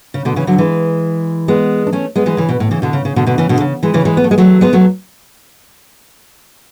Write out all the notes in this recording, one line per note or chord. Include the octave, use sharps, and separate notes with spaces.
C#3
B2 D3
C#3 E3
D3 F#3
E3 G#3
G#3 B3
D4
A3 C#4
G#3 B3
E3 G#3
C#3 E3
B2
A2
C#3 E3
B2 D3
C#3
C#3
B2 D3
B2 D3
C#3 E3
B2 D3
C#3
E3 G#3
C#3 E3
E3 G#3
B3
A3
G#3
F#3 A3
G#3 B3
F#3 A3